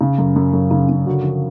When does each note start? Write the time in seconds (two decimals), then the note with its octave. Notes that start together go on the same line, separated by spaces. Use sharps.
0.01 C#3
0.18 F#2
0.36 F#2
0.53 F#2
0.71 C#3
0.89 C#3
1.06 D3 F#4
1.24 F3